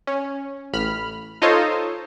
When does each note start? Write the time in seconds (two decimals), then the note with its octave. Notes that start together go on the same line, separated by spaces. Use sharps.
0.07 C#4
0.73 A1 B5 F6
1.42 D#4 F4 A4 C5 C#5 D#5